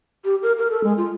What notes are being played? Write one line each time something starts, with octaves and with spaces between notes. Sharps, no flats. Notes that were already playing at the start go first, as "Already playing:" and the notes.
G4
A#4
A#4
A4
G#3
F4